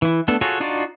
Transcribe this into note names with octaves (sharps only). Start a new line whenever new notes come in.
E3 E4
A3 B3 D4 A4
F4 F#4 G#4 A4 C#5
D4 D#4 F4 F#4 D5